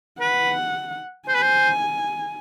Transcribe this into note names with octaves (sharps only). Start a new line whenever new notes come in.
B4 F#5
C5 G#5
B4
C5